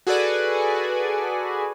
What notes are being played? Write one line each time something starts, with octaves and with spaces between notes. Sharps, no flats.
F#4 G#4 A4 B4 D5 G#5